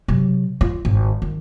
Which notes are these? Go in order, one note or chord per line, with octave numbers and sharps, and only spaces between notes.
C3 F#3
F4
G#1
D#3